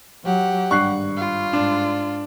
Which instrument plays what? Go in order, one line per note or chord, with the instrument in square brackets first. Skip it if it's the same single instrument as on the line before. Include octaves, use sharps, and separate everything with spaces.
[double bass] F#3 [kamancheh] G4 F#5
[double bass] G#1 [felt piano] G2 [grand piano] C#6 F#6 C7
[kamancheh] F4
[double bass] G#2 [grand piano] D4